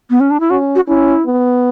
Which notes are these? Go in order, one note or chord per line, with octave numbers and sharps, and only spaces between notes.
B3
C#4
D4
E4
C#4 F#4
F#4
C#4 E4
B3